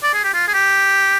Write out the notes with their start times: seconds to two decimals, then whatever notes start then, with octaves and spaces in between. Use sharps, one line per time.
0.03 D5
0.14 G#4
0.24 G4
0.34 F4
0.48 G#4
0.54 G4